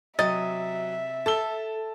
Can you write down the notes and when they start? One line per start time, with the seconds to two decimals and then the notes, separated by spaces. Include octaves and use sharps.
0.19 C3 F#3 D#5 E5 A6
1.26 A4 A5 E6 G7